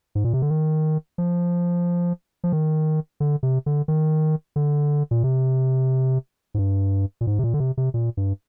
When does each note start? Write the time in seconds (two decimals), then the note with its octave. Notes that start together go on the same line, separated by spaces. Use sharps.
0.15 G#2
0.24 A#2
0.34 C3
0.42 D3
0.50 D#3
1.18 F3
2.44 F3
2.53 D#3
3.20 D3
3.43 C3
3.66 D3
3.88 D#3
4.56 D3
5.11 A#2
5.24 C3
6.54 G#2
6.58 G2
7.21 A#2
7.27 G#2
7.39 C3
7.44 A#2
7.54 D3
7.60 C3
7.77 C3
7.94 A#2
8.17 G2